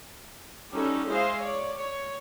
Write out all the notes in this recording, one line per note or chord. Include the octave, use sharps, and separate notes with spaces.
G3 C#4 D#4 F#4 G4 A4
G#3 E4 G#4 C5 D#5 F5
C#5 D5
C#5